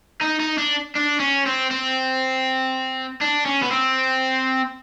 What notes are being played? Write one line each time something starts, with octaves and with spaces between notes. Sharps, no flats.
D#4
D#4
D4
D4
C#4
C4
C4
D4
C#4
B3
C4